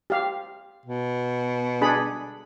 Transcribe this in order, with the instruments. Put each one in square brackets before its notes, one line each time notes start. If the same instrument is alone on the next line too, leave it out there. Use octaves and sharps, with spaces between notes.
[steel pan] G4 F5
[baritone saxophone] B2
[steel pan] D4 G#4 B5